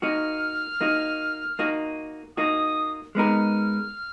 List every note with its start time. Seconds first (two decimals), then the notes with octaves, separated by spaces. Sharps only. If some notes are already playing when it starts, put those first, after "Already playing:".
0.02 A#3 D#4 F#4 F6
0.81 A#3 D#4 F#4
1.59 A#3 D#4 F#4
2.37 A#3 D#4 F#4 D#6
3.15 G#3 B3 D#4 A#4 F6